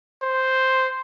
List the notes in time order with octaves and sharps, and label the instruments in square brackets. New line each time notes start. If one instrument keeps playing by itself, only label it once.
[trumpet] C5